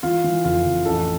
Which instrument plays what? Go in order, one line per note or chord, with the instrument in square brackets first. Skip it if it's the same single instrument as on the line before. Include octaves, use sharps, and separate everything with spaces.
[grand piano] E3 F4
E3
F1 F4
F1
A1 A4